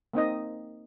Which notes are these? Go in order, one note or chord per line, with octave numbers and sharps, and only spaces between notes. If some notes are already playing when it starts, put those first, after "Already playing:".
A#3 C4 D#4 D#5